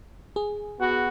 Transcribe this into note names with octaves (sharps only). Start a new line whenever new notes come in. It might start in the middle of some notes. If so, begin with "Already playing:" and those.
G#4
B3 F#4